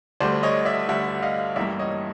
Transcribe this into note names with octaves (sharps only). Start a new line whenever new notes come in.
D2 D3 G3 C5 D5
C#5 D#5
D5 E5
D2 D3 G3 E5 F#5
D#5 F5
A1 G2 E3 G3 A#3 D5 E5
C#5 D#5